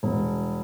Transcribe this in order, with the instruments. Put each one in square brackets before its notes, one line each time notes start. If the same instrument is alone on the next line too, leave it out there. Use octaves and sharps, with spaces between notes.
[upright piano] E1